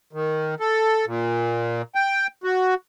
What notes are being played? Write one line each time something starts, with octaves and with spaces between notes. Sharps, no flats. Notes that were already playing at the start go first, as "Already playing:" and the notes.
D#3
A4
A#2
G5
F#4